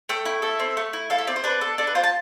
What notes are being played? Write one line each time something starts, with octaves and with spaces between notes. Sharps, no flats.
A3 G5
E4
A4 E5
C4
A3
E4
A4 F5
E5
C4 D5
C5
D4 B4
A4
D4 A4
B4
F4 C5
A5